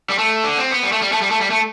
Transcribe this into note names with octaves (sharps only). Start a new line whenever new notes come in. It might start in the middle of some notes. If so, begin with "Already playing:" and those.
G3
A3
D3
C4
B3
G3
A3
G3
A3
G3
A3
G3
A3